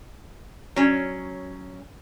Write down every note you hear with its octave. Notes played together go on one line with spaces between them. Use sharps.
F#3 C#4